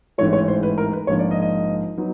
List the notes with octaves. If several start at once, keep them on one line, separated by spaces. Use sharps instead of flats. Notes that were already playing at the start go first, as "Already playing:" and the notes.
A1 G#2 E3 A3 C#5
C#5
C5
B4
A#4
B4
A#1 G#2 F3 A#3 C#5
D5
D#5
D#5
F#3 B3 D#4